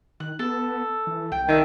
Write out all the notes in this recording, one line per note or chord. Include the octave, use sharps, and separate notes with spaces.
D#3 F#6
B3 A4 A5
E3
C2 G5
D#3 D4 E5